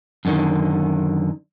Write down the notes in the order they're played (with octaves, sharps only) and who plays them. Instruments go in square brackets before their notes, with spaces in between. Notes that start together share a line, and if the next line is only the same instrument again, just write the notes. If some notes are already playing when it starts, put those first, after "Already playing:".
[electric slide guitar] F#2 A2 D3 D#3